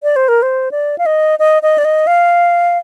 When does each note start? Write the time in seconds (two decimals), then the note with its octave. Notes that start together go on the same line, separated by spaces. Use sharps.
0.03 D5
0.16 C5
0.28 A#4
0.42 C5
0.71 D5
0.98 F5
1.06 D#5
1.39 D#5
1.63 D#5
1.78 D5
1.85 D#5
2.07 F5